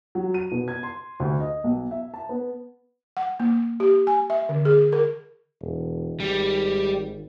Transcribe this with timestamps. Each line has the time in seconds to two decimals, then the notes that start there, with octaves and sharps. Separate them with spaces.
0.15 F#3
0.34 D#7
0.51 B2
0.68 G#6
0.83 C6
1.20 D2
1.40 D#5
1.64 B1
1.91 E5
2.14 A5
2.29 B3
3.17 F#5
3.40 A#3
3.80 G4
4.07 G#5
4.30 E5
4.49 D3
4.65 G#4
4.92 A#4
5.61 E1
6.20 G#1 G3